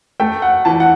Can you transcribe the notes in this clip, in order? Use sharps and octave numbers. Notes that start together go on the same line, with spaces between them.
A3 G5
F#5
E3 A5
F#5